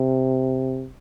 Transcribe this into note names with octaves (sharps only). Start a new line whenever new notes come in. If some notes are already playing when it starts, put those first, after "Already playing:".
Already playing: C3